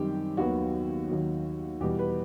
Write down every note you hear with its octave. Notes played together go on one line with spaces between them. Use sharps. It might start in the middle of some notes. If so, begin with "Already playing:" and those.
Already playing: F#2 D#3 G3 C4 G4
D#2 D#3 F#3 B3 F#4
D#2 D#3 F#3
E2 B2 G3 G4
B4